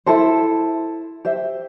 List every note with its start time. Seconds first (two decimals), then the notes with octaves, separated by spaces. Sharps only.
0.06 E4 A4 C5
1.25 G4 C5 E5